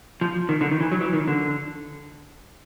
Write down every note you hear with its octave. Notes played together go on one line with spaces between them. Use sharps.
F3
D#3
D3
D#3
E3
F#3
E3
D#3
D3